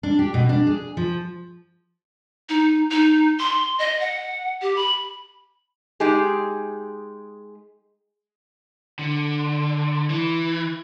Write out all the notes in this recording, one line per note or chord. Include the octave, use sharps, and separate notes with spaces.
D4
G4
B2
D4
G#4
F3
D#4
D#4
C6
D#5
F#5
G4
B5
G#3 D#4 G4 G#4
D3
E3